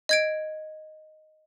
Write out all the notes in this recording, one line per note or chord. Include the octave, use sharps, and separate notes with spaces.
D#5 G#6 D7